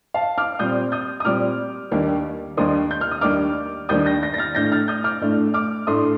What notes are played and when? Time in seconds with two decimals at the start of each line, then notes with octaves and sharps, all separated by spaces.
0.14 F5 A5
0.38 D6 F6
0.59 A#2 G3 C4 D#6 G6
0.92 D#6 G6
1.20 D#6
1.25 A#2 G3 C4 D6 F6
1.91 D#2 D#3 G3 A#3 D4
2.57 D#2 D#3 G3 A#3 D4 C6 D#6
2.91 G6
3.01 F6
3.11 D#6
3.21 D#2 D#3 G3 A#3 D4 D6 F6
3.89 D#2 D#3 G3 A#3 D4 D#6 G6
4.06 G6 A#6
4.23 G6 A#6
4.34 A#6
4.38 F6 A6
4.55 A2 A3 D4 G6 A#6
4.72 F6 A6
4.88 D#6 G6
5.04 D6 F6
5.21 A2 A3 D4
5.54 D6 F6
5.87 A2 A3 D4 C6 D#6